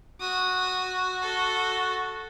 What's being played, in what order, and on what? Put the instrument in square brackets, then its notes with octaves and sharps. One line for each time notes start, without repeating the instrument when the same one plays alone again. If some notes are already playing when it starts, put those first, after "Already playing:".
[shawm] F#4 [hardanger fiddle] D#6
[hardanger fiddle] A4